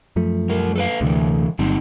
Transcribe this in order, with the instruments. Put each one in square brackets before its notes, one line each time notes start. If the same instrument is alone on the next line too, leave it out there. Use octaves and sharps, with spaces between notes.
[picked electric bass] F#2 F3 A3
[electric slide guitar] G3 A#4
A4 B4 F5
[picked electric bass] D2 [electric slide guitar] C3 E3
[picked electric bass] G1 [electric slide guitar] F#3 C4 D#4